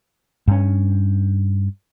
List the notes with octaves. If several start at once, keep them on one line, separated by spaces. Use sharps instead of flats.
G2 C#4